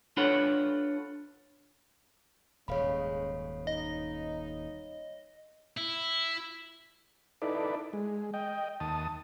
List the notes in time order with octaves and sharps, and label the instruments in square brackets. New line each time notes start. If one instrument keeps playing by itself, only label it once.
[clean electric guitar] D4 F4 A4 B4 C#5 F#5
[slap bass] D#1 G#2 [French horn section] C#3 G#3 [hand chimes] C#5 F5 B5
[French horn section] D#4 [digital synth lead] D#5
[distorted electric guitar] E4
[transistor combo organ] D#4 E4 A4 B4 D5
G#3
D#5 G5
D#2 A5 D#6